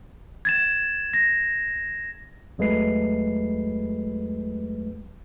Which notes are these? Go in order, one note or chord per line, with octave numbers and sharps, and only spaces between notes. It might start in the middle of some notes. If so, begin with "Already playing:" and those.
G#6 A6 E7
A#6
E2 F#3 G#3 A3 B4 C7